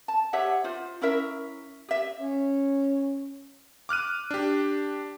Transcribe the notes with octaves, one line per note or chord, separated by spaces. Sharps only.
A5
G4 C#5 E5 F#5
F4 C5
C#4 E4 A#4 E5
G4 E5
C#4
D6 F6 F#6 D#7
D4 G4